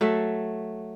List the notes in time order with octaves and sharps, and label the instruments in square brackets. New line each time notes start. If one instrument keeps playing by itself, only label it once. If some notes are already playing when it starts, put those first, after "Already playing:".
[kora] F#3 A3 A4 E5